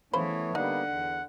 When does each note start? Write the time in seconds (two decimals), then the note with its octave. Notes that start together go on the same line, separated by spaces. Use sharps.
0.13 C#3 E3 A3 B3 C5 C#5 B5
0.55 D3 G3 A#3 B3 D#4 F#5
0.87 E2